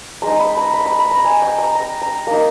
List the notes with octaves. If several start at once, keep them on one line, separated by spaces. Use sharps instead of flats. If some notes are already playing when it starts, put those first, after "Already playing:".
G#3 D#4 A#5
B5
A#5
B5
A#5
B5
A#5
G#5
G5
A#5
A#5
A#5
A#3 D#4 A#5